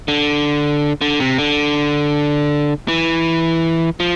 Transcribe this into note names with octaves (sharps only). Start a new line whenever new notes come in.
D3
D3
C3
D3
E3
F3